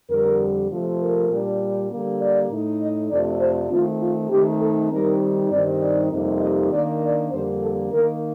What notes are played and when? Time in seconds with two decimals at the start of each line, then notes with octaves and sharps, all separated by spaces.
0.10 F2 D3 G3 A#4
0.71 C3 F3 A3
1.00 A#4
1.31 A#2 G3 D4
1.90 D3 G3 A#3
2.21 D5
2.50 A2 A3 D#4
2.81 D#5
3.10 F2 C3 F3 A3 D4 D5
3.40 C5
3.71 D#3 A3 C4 F4
4.01 F4
4.31 D#3 A3 C4 D#4 G4
4.61 A4
4.91 D#3 G3 C4 D#4 A#4
5.51 G2 D#3 G3 C4 D#4 D5
5.81 D5
6.11 F2 C3 G3 A#3 D#4
6.41 D#5
6.71 D#3 A#3 D4 D5
7.02 D5
7.31 F2 D3 G3 A#3 C5
7.62 A4
7.91 D#3 A#3 D#4 A#4